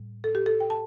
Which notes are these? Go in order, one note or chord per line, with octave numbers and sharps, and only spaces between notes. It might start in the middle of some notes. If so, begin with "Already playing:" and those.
Already playing: A2 G3
A4
G4
A4
G5
A5